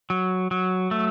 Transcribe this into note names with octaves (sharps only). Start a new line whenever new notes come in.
F#3
F#3
A3